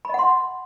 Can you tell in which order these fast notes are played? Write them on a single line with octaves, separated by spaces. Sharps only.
B5 D#5 F#5 C6